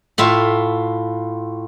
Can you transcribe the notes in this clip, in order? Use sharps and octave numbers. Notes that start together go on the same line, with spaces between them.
A2 F4 E5